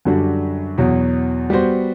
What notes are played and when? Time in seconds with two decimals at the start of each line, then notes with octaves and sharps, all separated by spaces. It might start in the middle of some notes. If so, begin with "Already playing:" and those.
0.05 F#2 D3 G3 D4 F#4
0.78 E2 B2 F#3
1.50 G3 B3 F#4 C5